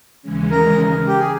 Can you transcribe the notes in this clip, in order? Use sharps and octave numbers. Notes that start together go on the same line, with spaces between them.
D#2 C#3 E3 G#3 C#4
A#4
G4
G#4